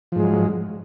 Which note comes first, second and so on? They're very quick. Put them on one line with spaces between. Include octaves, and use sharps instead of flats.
F3 G#2 G#3 F#3